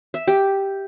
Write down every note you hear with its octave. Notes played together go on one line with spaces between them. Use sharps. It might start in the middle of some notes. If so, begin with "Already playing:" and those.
E5
G4